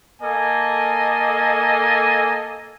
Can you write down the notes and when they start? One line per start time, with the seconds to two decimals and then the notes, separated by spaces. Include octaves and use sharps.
0.22 A#3 A4 D#5 G#5